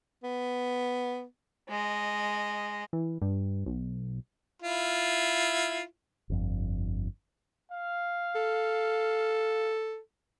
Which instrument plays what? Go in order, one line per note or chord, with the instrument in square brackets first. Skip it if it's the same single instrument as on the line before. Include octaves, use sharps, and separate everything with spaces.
[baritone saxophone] B3
[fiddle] G#3 D#5
[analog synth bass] E3
G2
B1
[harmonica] E4 F4
[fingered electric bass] G1 F2
[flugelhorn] F5
[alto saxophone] A4